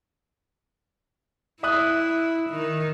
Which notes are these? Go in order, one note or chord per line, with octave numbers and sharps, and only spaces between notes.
E4 E5 D#6 F#6
D#3